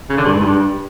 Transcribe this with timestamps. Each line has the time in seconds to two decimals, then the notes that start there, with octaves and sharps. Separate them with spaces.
0.10 C#3
0.17 D3
0.25 G2
0.33 G#2
0.41 G2